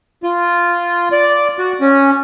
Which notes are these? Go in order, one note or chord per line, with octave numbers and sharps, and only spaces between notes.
F4
D5
F#4
C#4